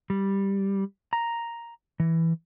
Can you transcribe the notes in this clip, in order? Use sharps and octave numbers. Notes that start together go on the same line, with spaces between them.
G3
A#5
E3